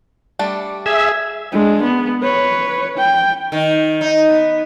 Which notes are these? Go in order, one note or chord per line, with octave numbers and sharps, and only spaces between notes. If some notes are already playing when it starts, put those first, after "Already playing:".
G3 A3 D4
G#4 E5
G#3 D4
B3
B4 C#5
G5
D#3
D#4
B3